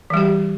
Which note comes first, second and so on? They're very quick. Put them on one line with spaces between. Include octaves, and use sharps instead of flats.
E3 G3 G4